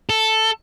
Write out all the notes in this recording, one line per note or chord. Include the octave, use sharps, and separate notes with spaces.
A4